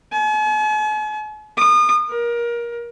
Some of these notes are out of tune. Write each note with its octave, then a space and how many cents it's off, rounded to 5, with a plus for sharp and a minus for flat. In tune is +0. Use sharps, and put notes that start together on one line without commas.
G#5 +45
D#6 -35
A#4 +25